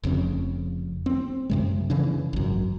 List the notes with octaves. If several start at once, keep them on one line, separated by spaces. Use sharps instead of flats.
F1 F2 C#3 C4
C4
F#2 C3 G#3
C#3 E3 D4
G#1 F#2